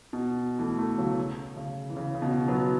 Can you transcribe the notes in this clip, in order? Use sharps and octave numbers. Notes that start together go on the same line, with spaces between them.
B2
E3 A3
E3 A3
C#3 F#3
C#3
E3
C#3
C#3
B2
F#3 B3